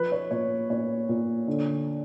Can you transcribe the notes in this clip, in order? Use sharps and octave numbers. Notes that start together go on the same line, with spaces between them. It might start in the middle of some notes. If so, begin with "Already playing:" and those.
Already playing: F3 B4
C#5
A#2 C#5
A#2 C#5
A#2
D3